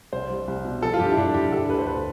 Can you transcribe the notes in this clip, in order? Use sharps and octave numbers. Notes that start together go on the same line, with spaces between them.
C2 C5
G3
C2
B2
F3 A4
F4
G2 G4
E4
G2 D4
G2 G4
G4
D3 A4
D2 B4
C5
D2 B4